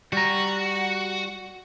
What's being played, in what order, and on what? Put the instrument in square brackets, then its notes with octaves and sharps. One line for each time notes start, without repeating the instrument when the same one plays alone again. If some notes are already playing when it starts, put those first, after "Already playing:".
[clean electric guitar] G3 A#5 [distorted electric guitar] F#4